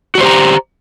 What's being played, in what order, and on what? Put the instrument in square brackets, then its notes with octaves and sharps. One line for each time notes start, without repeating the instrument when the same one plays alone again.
[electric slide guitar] F#4
D5
C5
G4
A#5